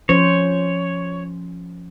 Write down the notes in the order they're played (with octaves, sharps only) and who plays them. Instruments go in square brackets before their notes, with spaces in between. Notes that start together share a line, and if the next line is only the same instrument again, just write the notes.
[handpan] F3 C#4 C5 [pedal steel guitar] C#5